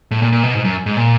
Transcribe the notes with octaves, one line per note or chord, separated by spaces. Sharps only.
A2
A#2
A#2
B2
G#2
F#2
G#2
A#2